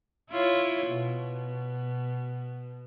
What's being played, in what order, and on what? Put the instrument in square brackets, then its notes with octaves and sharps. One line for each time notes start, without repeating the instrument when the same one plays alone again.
[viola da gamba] E4 F4 C#5
B2